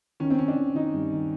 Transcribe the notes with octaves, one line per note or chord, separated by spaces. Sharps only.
D#3 C#4
C4
D#3 C#4
D4
D#3
D#3 D#4
G2
D#3